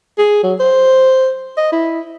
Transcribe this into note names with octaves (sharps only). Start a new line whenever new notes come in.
G#4
F#3
C5
D#5
E4